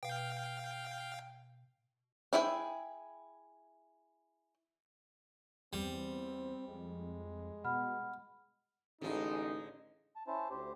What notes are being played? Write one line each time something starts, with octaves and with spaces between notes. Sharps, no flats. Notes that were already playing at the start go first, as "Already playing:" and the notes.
B2 F5 G5
D4 E4 G#4 E5 G5
E2 G3 C4
F2 G#3
B2 F#5 B5 F6
A1 D3 G#3 D#4
A5
C#4 E4 C5 A5
D2 G4 C5